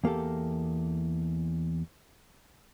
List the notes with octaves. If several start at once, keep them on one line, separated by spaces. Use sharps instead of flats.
E2 A#3 G4 A4